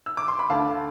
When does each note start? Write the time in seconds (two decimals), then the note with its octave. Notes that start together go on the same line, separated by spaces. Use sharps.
0.06 E6
0.17 D6
0.28 C6
0.39 B5
0.50 D2 D3 A3 F5 A5